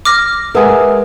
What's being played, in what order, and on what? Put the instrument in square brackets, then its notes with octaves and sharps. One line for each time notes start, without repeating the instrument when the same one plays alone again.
[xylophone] D6 F6 A#6
[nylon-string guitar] G#3 E5 [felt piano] A#4 F#5 G#5 [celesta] B4 D#6